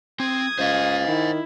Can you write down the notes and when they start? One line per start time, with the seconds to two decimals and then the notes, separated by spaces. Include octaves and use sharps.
0.20 C4 D#6 G#6
0.59 C#2 C5 D#5 F5
1.08 D#3 E4